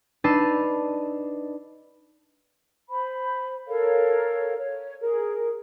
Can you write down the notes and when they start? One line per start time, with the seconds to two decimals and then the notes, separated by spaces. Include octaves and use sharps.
0.24 D4 D#4 B4 A5 E6 C7
2.89 C5 B5
3.67 A4 A#4 C#5 F5
4.57 C#5
5.01 G#4 A#4